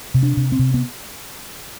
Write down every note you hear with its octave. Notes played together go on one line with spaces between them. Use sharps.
C3
D4
C3
C4
C3
B3